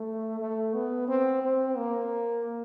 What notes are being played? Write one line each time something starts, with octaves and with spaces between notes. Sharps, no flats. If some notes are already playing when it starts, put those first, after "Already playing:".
Already playing: A3
A3
B3
C4
C4
A#3